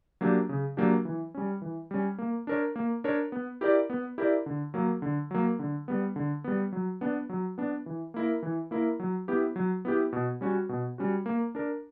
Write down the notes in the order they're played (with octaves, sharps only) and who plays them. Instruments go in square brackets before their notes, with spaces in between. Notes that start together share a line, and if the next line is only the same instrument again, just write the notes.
[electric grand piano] F#3 A#3 D4 G4
C#3
F#3 A#3 D4 G4
E3
G3 C#4
E3
G3 C#4
A#3
D4 A#4 C#5
A#3
D4 A#4 C#5
B3
E4 G4 A#4 D5
B3
E4 G4 A#4 D5
D3
F#3 A#3
D3
F#3 A#3
D3
G3 B3
D3
G3 B3
F#3
B3 D4
F#3
B3 D4
E3
A#3 E4 A#4
E3
A#3 E4 A#4
F#3
B3 E4 G4
F#3
B3 E4 G4
B2
G3 C#4 F#4
B2
G3 C#4 F#4
A#3
D4 A#4